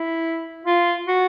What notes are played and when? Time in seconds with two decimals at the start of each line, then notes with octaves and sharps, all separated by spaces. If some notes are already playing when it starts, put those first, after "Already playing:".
Already playing: E4
0.66 F4
1.08 F#4